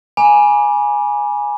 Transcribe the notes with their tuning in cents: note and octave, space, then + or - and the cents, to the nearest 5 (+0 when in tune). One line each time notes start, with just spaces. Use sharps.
G#5 +0 B5 -40 D6 +0